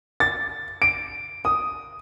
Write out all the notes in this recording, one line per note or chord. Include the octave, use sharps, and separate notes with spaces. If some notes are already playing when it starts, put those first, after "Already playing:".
A6
D7
D#6